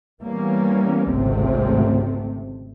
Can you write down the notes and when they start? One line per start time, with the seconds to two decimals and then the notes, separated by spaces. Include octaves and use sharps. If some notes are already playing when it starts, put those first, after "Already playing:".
0.22 E3 G3 A#3 B3 C#4
1.11 G#1 C#2 C3 A3 C4